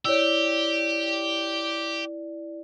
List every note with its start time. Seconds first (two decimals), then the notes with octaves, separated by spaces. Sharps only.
0.05 E4 G4 C#5 D5 E6